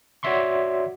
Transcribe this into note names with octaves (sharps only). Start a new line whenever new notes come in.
F#4 C#5 D5 E5 C6 C#6